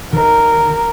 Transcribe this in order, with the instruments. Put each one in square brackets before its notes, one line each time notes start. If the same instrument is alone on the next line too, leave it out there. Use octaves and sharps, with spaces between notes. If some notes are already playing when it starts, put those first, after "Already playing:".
[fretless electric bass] D#3 [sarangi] A#4